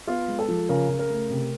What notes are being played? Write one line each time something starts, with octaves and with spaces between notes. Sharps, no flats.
B3 F4
G#3
A4
F3
C#3 A#4
C#3
A#4
A3
C3